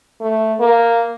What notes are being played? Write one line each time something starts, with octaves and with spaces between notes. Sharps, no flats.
A3
A#3